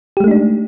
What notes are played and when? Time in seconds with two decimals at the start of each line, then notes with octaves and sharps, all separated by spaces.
0.17 G4
0.20 G#3
0.24 A3
0.28 D#4
0.31 D4